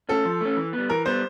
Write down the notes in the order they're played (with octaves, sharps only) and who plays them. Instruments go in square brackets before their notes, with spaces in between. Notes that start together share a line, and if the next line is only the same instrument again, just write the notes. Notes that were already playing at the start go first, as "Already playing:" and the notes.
[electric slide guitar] A3 C#4 [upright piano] A4
[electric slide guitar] F3
A3 C#4
E3
B3
G3
[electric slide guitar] E3 [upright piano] A#4
[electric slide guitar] G3 B3 [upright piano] C5